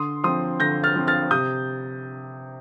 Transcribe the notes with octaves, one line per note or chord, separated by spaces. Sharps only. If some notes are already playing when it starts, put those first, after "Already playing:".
Already playing: D3 C6 D#6
F3 C4 C6 D#6
D3 G6 A#6
F6 A6
F3 C4
F6 A6
C3 D#6 G6